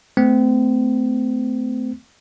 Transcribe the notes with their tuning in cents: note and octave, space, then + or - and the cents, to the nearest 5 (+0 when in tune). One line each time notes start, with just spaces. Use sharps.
A3 +0 C4 -35